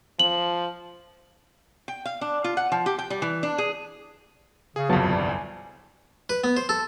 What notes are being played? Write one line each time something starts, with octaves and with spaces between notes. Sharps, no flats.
F3 F#7
G5
F5
D4
F4
F#5
F3
G4
G5
G3
E3
D4
G#4
C#3 G#4
G1 C2 F2 F#3 B3 A5
G3
G#5
B4
B3
C5
A4